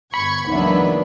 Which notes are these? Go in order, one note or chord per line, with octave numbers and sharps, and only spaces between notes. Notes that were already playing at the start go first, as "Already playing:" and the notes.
G1 B5 C#6 G#6
C#2 E3 F#3 A#3 B3 D4 D#4 E5